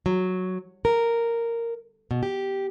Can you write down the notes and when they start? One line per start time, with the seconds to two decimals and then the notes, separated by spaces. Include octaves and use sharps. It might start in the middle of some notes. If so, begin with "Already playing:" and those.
0.06 F#3
0.85 A#4
2.11 B2
2.23 G4